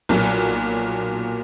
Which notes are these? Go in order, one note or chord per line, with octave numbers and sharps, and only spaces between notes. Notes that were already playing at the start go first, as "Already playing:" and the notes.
B1 A#2 F#3